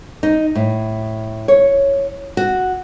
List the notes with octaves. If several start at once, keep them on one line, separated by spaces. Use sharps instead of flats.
D#4
A2
C#5
F#4